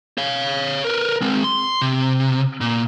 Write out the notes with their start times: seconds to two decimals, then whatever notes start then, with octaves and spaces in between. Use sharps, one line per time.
0.18 C#5 F5
0.84 A#4 B4
1.22 G#3 C4
1.44 C6
1.82 C3
2.61 A#2